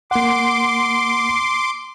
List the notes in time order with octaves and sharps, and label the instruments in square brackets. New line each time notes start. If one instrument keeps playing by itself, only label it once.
[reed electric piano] A#3 F#5 [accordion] C6 D6